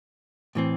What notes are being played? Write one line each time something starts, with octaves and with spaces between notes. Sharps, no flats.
A2 E3 C4